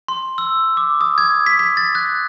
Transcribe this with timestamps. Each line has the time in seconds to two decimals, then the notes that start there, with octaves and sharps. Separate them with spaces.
0.08 C6
0.38 E6
0.77 D6
1.01 D#6
1.18 G#6
1.46 B6
1.59 B6
1.77 A6
1.95 F#6